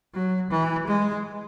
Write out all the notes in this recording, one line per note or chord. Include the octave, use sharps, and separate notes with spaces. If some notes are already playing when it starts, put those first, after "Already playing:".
F#3
E3
G#3